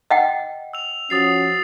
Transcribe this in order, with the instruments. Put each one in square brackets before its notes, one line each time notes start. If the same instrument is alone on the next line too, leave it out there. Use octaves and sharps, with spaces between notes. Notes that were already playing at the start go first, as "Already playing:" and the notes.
[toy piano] D#5 F#5 G5
[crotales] E6 F7
[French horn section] F3 C#4 F#4 [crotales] D#6 A6 C7